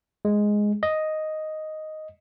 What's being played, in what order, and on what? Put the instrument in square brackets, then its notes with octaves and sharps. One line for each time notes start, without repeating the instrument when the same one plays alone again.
[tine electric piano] G#3
D#5